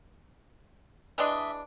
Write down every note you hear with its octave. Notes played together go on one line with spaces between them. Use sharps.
E3 G#3 D4 D#5 E5